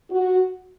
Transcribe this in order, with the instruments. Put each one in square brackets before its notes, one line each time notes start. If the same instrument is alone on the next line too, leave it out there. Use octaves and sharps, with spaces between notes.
[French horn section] F#4